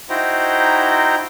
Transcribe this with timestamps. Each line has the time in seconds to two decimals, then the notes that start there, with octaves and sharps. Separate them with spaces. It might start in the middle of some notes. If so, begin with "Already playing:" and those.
0.09 D#4 E4 F#4 C5 G5 A#5